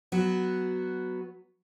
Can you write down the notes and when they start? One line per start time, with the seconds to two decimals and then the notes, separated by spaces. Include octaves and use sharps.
0.12 F#3 B3 F#4